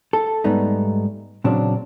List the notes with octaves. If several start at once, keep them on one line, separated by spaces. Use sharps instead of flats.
A4
G#2 G3 A3 B3 D#4
A#2 C#3 F#3 C4 D4